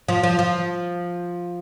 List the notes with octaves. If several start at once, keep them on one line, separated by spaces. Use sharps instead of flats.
F3
F3
F3